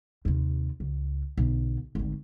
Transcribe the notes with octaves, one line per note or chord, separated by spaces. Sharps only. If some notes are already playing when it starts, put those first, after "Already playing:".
D#2 C3
C#2
B1 D3
G#1 D2